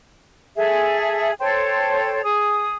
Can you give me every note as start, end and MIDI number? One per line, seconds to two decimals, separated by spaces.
0.56 1.32 68
0.56 1.32 69
0.56 1.32 76
1.39 2.21 69
1.39 2.21 72
1.39 2.21 73
1.39 2.21 79
2.23 2.76 68
2.23 2.76 87